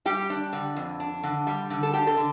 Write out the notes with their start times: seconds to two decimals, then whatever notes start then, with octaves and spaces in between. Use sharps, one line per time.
0.06 G3 G4
0.30 D4
0.53 D3
0.76 F2
1.00 D4
1.23 D3
1.47 G3
1.70 D3
1.83 A4
1.93 D4 G4
2.07 A4
2.17 D3